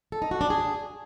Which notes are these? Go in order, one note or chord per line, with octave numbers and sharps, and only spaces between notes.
A4
D#4
F#4
D4
G#4